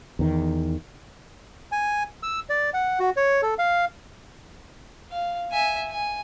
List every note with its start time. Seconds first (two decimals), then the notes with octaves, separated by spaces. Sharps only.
0.19 E2 D#3
1.72 G#5
2.23 E6
2.50 D5
2.74 F#5
3.00 F#4
3.17 C#5
3.42 A4
3.59 F5
5.11 F5
5.52 E5 G#5
5.90 G#5